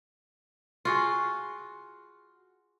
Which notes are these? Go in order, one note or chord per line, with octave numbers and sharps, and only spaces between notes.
F4 F#4 G#4